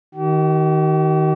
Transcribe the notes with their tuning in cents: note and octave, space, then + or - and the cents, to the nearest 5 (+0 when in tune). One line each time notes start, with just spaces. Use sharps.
D#3 +10 G4 -45